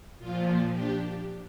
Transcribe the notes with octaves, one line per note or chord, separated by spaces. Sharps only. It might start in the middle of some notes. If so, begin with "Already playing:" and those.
A#2 F3 F4
D4 G4